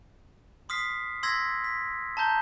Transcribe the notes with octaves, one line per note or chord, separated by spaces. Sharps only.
C6 D#6 F6 B6 C7
C6 E6 G#6 A#6 B6
B6
A5 A#5 G6 G7